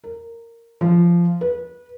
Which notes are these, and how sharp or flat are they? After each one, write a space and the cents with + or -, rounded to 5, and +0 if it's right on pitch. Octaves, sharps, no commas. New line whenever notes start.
A#4 -15
F3 -15
B4 -25